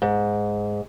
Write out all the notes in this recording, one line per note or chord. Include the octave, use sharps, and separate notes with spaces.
G#2